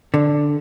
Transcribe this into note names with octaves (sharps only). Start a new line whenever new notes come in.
D3